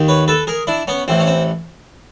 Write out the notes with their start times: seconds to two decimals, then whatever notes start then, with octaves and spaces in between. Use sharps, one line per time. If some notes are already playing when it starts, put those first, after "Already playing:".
Already playing: D#2 D#3
0.08 B4 C#5
0.28 A4 B4
0.47 G#4 A#4
0.67 D4 E4
0.88 B3 C#4
1.08 A1 A2 E3 C4
1.20 C#4
1.27 C4